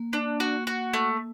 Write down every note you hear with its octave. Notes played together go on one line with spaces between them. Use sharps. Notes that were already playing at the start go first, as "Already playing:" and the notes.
Already playing: A#3
D4
F#4
F#4
A3